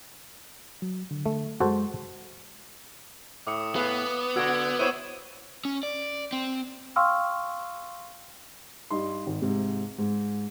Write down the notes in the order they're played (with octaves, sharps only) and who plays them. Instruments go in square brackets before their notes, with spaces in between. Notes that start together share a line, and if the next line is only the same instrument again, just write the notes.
[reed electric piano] F#3
D3
[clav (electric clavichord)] A3
[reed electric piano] F#2 G#3 [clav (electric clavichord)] F#4 A4 C5
[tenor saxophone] A2 [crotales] D6 D#6 C#7
[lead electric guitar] B3 [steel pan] G#4 B4 F5
[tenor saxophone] D3 [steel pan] F#4 F#5 [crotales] E6 G#6 D7
[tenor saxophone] E4 [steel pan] C5 C#5 F#5 [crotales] D#7 E7
[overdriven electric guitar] C#4
D5
C4
[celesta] F5 G5 C6 C#6 E6 F6
[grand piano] G2 D#4 C6
G#1
G#2 C3
G#2